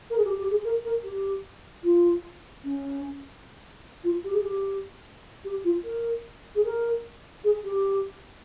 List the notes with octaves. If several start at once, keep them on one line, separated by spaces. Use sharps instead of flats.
A#4
G#4
G4
G4
G#4
A#4
A#4
G4
F4
C#4
F4
G4
G#4
G4
G4
F4
A#4
G#4
A#4
G#4
G4